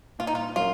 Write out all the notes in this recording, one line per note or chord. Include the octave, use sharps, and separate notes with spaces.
A#2 F4
D#4
F4
F#3 A#3 C#4 F4